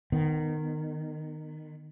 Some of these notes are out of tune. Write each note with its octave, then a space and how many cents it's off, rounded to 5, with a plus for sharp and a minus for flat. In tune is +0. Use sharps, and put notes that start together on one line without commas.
D#3 -20 B3 +10